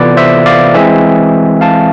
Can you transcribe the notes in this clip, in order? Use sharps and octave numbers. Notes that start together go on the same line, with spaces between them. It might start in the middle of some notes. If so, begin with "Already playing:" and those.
Already playing: C3 E3 B3 F4 A4 B4 D5
C5 E5
D5 F5
E3 G#3 C4 E5 G#5
F5 A5